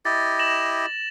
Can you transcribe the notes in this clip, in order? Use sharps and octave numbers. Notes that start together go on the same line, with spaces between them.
E4 G4 D#5 A6
A#6 E7 F#7